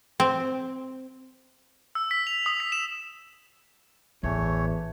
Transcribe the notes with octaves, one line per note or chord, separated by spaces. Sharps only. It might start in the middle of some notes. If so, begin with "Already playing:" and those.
C4
E6
B6
F7
D#6
B6
E7
A1 E2 E3 A3 C#5